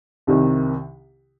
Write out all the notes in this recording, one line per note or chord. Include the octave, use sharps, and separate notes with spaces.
C2 C3 D#3